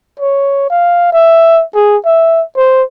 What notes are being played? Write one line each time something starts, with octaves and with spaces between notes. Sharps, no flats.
C#5
F5
E5
G#4
E5
C5